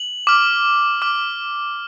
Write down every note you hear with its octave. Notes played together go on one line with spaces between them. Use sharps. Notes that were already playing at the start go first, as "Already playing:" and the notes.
Already playing: F#7
D6 F6
D6 F6